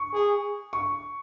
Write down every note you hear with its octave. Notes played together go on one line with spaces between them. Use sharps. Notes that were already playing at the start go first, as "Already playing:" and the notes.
Already playing: C#6
G#4
C#6